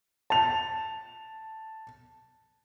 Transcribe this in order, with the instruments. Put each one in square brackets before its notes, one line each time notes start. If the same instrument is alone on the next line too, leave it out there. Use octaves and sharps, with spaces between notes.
[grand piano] A5 F7